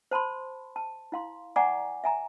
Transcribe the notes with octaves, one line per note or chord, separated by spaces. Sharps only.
C5 A5 B5 C6
A5
E4 F5 C6
D5 F#5 G#5 A#5 C#6 D6
E5 G#5 A#5